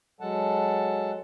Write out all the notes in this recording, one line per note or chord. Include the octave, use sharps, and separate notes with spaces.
F#3 G#3 A4 F#5 A5